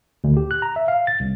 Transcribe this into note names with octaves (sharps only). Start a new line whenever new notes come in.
D2
G4
F#6
A#5
E5
F5
A6
C2